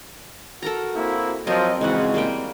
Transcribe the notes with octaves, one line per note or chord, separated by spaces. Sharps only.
F#4 A4 A#4 A#5
A#3 C4 E4
F3 F#3 C4 A#4 D#5
A#1 G#2 C#3 E3 G#3 C4 F#4 F#5
G3 A#3 G5